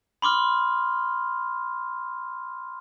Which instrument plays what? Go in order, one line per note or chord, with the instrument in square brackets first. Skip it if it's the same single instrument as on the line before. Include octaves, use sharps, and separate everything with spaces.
[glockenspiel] B5 C6 D6 F6